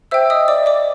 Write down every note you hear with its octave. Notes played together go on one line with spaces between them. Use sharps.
C5 E5 G5 E6
D#5 D#6
D5 D6
D5 D6